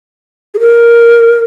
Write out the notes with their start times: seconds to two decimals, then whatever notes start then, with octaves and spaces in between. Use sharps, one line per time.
0.55 G#4
0.60 A#4